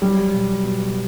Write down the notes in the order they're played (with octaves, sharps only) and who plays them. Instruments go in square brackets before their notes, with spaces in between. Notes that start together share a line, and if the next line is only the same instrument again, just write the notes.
[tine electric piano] F#3 [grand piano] G3
[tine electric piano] B2
B2